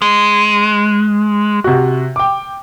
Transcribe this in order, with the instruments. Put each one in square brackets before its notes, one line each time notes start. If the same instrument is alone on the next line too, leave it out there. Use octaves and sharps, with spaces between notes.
[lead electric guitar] G#3
[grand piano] C3 F#4
G5 D6